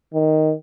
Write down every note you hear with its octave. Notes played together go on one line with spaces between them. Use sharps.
D#3